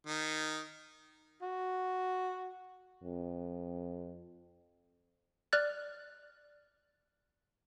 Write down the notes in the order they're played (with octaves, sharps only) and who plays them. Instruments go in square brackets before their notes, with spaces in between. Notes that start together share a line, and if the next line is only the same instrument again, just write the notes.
[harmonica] D#3
[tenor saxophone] F#4
[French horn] F2
[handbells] D5 F6 F#6 A6